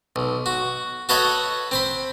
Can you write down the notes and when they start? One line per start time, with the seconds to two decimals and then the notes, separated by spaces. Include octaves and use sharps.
0.16 B1
0.46 F#4
1.09 F#4 A4 B4 C#5 D#5 F#5
1.71 C4 C5 B5